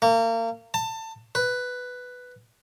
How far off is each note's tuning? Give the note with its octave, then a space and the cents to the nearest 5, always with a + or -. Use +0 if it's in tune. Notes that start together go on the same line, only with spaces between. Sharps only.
A#3 -35
A5 +25
B4 +5